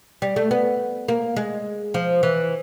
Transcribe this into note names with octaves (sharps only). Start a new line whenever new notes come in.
G3
A3
B3
A#3
G#3
F3
E3